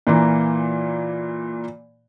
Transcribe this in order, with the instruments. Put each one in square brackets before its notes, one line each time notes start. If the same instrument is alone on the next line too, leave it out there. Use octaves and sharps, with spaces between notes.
[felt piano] A#2 E3 A#3